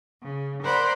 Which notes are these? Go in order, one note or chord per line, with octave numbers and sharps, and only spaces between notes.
C#3
A#4 C5 D5 F#5 B5 C6